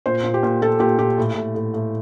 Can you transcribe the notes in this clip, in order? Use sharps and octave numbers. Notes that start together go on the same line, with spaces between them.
A#2 C5
A#2
G4
A#2
A#2 A4
A#2 G4
A#2 G4
A2
A2
A2
A2